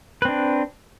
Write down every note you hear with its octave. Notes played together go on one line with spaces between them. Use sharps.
C4 D4 B4